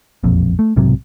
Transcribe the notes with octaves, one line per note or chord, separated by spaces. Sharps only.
E1 A#1 F2
A3
B1 G#2 C3 F#3